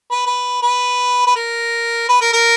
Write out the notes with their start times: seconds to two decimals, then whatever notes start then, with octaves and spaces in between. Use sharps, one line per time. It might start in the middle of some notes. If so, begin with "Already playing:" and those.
0.11 B4
0.26 B4
0.63 B4
1.27 B4
1.36 A#4
2.09 B4
2.22 A#4
2.33 A#4